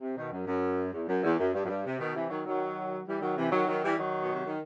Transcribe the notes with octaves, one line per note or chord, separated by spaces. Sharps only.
C3
B2 D#3
F#2
F#2
E2
F#2
E2
F#2
G2
F#2
G2
C3
B2 D#3
C3 E3
D#3 F#3
D#3 F#3
E3 G3
D#3 F#3
C3 E3
D#3 F#3
D#3 F#3
E3 G3
D#3 F#3
B2
C3
D#3